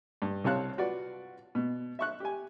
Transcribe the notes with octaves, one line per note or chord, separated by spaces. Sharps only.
G2
C2 C4 C#5 F5 A5 F#6
F4 F#4 B4 D5
B2
E5 C#6 F#6
G4 G#5